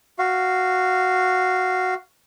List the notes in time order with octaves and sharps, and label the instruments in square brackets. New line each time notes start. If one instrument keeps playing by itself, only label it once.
[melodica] F#4 F5